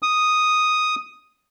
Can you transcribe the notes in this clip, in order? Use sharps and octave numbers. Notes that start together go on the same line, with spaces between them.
D#6